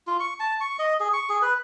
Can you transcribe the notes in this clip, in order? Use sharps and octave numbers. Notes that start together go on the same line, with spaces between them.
F4
C#6
A5
C#6
D#5
G#4
C#6
G#4
B4